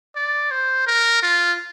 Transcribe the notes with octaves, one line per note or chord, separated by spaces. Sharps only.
D5
C5
A#4
F4